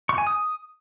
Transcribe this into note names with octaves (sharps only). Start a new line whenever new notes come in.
C#6
G#5
D#6